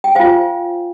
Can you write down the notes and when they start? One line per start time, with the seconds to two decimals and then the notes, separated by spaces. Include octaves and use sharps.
0.04 G5
0.15 F4 C5 F5 G#5